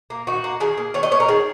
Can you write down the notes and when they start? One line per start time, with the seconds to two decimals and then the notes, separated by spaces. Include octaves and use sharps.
0.10 A#3
0.27 D#3 F#4
0.44 A#3
0.60 D#3 G#4
0.77 A#3
0.94 D#3 C#5
1.03 D#5
1.11 A#3 C#5
1.20 A#4
1.28 D#3 G#4